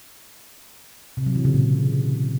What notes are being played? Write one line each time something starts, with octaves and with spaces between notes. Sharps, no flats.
C3
F#3
E3
C#3
A#2